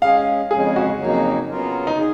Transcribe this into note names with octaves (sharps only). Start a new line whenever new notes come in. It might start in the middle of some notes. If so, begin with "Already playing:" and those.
G#3 C#4 G#4 F5
F2 C#3 G#3 C#4 G#4
F#4
F2 C#3 F#3 A#3 D#4
C#3 F#3 B3 F4 A#4
D#4
G#4